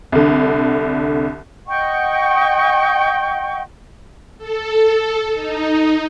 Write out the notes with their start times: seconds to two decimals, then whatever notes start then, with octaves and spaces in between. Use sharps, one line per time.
0.12 C2 D3
1.67 D#5 F#5 G5 C#6
4.38 A4
5.34 D#4